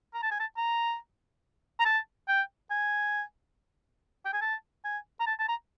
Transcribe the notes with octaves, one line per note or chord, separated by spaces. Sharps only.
A#5
A5
G#5
A5
A#5
A#5
A5
G5
G#5
G5
G#5
A5
G#5
A#5
A5
A5
A#5